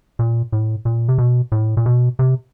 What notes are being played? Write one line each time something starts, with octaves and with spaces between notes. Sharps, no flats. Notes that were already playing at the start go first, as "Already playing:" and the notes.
A#2
A2
A#2
C3
B2
A2
A#2
B2
C3